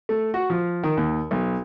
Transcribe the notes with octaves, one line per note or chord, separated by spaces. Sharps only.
A3
F#4
F3
D#3
D#2
B1